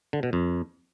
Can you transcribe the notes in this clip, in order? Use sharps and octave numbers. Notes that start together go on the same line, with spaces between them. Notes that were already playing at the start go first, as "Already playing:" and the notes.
D3
B2
F2